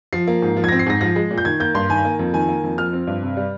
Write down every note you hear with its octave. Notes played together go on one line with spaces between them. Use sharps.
F3 C7
A#3
G#2
F3
G#6
C4 A#6
C7
G#2 A#6
F3 A#6
G#3
A#2
G6
D#3 G#6
A#3 G6
G2 C6
D#3 G#5
A#3
F2
D#3 G#5
A#3
F2
F3 F6
C4
G2
C3
G3